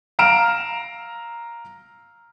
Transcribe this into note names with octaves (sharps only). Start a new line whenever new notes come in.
F5 A#5 F6 D7 E7 F7